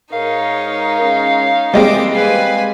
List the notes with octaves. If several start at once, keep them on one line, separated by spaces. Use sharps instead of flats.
G#2 D#4 A#4 C#5 F5
G#3 C#4
E3 F3 G3 G#3 A#3 C4 D#5 D6
B4 F5 G#5